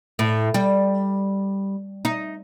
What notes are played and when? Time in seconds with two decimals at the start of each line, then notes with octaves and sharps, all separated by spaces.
0.19 A2
0.54 G3
2.05 D#4